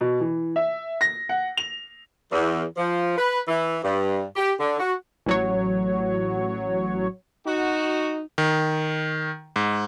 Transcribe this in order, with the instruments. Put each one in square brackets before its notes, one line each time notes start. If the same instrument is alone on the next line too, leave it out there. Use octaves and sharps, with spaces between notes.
[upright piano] B2
E3
E5
A#6
F#5
F7
[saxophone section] E2
F3
B4
E3
G2
G4
D3
F#4
[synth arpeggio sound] A1 F#3 C#5
[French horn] D#4 [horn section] F#4
[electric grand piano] D#3
G#2